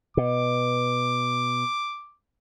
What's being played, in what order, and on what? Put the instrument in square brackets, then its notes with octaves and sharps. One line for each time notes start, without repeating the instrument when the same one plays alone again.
[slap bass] B2 [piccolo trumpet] D6